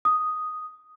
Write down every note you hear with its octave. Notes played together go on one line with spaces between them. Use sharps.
D#6